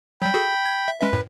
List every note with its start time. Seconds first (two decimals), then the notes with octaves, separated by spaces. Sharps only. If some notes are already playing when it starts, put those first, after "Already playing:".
0.22 F#3 G3 G5 B5
0.34 F#4 G#4 A4
0.66 G#6
0.88 E5
1.01 G#3 C#4 B4 E5
1.13 F#2 A2